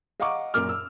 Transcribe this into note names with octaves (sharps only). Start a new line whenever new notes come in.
D#5 F5 F#5 A#5 C#6 D6
F#2 A#2 A#4 D6 F6
E6